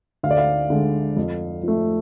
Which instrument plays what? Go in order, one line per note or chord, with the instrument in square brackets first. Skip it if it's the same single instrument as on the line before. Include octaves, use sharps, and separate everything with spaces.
[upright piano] D2 F5
D5
F5
D3 G#3
F2
F3 A3